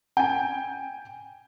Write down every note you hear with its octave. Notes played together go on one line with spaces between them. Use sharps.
G5 G#5